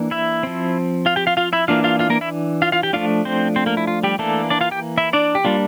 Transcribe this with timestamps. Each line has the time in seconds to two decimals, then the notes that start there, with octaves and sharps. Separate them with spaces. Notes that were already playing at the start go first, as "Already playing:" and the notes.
Already playing: E3 A#3 D4
0.11 E4 E5
0.43 F3 C4
1.06 F4 F5
1.16 G4 G5
1.27 F4 F5
1.37 F4 F5
1.53 E4 E5
1.68 E3 A#3 D4 F4 F5
1.84 F4 F5
1.99 F4 F5
2.10 A#3 A#4
2.21 E4 E5
2.62 F4 F5
2.72 F4 F5
2.83 G4 G5
2.93 F3 A3 D4 F4 F5
3.25 C4 C5
3.56 C4 C5
3.66 A#3 A#4
3.77 E4
3.87 F4
4.04 G3 G4
4.19 E3 A3 A#3 D4 A4
4.50 D4 D5
4.61 F4 F5
4.71 G4 G5
4.98 E4 E5
5.13 D4 D5
5.35 G4
5.45 G3 A#3 D4 F4